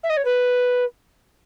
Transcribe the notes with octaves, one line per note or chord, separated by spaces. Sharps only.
E5
D#5
C#5
B4